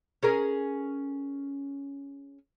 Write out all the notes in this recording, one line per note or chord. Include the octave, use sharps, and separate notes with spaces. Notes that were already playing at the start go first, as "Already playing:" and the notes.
C#4 G#4 A#4